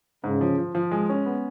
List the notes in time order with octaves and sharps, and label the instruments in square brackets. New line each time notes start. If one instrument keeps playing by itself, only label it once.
[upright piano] G#2 [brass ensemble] C#3
[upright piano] F3
F3
F3
G#3
C#4
B3